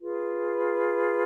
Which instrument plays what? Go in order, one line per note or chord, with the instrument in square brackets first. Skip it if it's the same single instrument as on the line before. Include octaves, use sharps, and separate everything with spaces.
[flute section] F4 G#4 B4